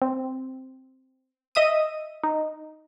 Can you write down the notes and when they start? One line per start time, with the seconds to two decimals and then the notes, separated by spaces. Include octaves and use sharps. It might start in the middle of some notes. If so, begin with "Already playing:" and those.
0.02 C4
1.55 D#5 E5 D#6 D#7
2.24 D#4